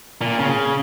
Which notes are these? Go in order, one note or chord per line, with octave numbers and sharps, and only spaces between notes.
A#2
C#3